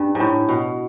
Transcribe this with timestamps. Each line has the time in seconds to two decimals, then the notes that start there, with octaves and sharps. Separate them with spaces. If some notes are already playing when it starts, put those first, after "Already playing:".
Already playing: G2
0.15 G#2
0.20 A2
0.49 B2